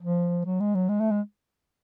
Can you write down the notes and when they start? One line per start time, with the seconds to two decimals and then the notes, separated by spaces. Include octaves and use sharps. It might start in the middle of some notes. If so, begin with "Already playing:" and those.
0.01 F3
0.45 F#3
0.60 G#3
0.75 F#3
0.89 G#3
1.00 A3
1.11 G#3